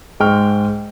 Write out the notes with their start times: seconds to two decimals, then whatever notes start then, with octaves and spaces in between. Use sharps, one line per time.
0.20 G#2 G#3 G5 C#6 F6